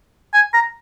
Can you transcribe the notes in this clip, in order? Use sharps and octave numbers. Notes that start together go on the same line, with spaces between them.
G#5
A#5